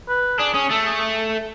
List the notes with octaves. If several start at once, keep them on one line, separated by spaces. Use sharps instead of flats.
B4
D4 G#4
C#4 G#4
A3 A4
G#4